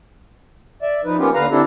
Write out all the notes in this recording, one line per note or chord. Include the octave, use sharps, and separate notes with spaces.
D5 E5
F3 D#4 B4
A#3 B3 C#4 F4 G4
D#2 D3 B4 F5 A#5
D3 C4 D4 E4 G4 A4